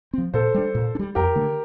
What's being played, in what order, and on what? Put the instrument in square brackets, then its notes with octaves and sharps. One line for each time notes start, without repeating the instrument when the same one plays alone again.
[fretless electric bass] F3 C4
[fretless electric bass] A#2 [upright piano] A4 C5
[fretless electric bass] G3 D4
A#2
D4
G3
[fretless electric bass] F2 [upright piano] G4 A#4
[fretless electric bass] D3 A3